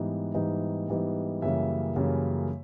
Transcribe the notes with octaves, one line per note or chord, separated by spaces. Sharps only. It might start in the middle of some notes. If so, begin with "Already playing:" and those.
Already playing: G#2 E3 G3 B3 D#4
G#2 E3 G3 B3 D#4
G#2 E3 G3 B3 D#4
F#2 C#3 E3 G3 A#3 E5
F#2 C#3 E3 G3 A#3